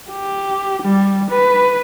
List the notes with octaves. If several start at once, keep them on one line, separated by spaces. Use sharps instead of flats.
G4
G3
B4